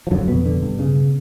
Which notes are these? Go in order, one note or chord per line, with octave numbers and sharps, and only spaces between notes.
F3
F#2 D3 F#3
F2 B2 B3
D3
G2
C#3